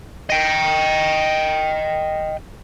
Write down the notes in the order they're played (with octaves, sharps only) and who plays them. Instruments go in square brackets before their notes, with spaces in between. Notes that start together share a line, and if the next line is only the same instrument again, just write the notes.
[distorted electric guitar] D#5 G5